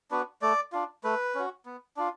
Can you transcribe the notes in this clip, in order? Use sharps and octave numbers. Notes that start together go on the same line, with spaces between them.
B3 D4 F#4 B4
A3 D5
D4 F4
A3 B4
C#4 F#4
B3
D4 F4